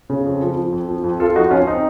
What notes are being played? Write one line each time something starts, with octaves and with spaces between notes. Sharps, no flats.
C#3
F2
F3
F3
F2
F3
F2
F2 F4 A4
F3 D#4 F#4
F2 C#4 F4
C4 D#4